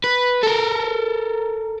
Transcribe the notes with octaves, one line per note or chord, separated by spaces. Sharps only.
B4
A4 A#4